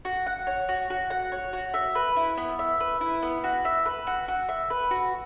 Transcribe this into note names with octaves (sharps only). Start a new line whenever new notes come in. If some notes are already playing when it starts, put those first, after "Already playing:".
F#4
F#5
C#5
F#4
F#4
F#5
C#5
F#4
E5
B4
E4
B3
E5
B4
E4
B3
F#4
E5
B4
F#4
F#4
E5
B4
F#4